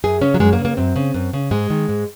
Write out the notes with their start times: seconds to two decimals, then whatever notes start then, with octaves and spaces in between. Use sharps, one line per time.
0.04 F#2 G#4
0.21 C#3 C#4
0.34 F#3
0.40 F#2 G#3
0.53 A#3
0.59 C#3
0.65 A#3
0.77 F#2 C4
0.96 C#3
1.14 F#2
1.33 C#3
1.51 G#2 G#3
1.70 D#3
1.89 G#2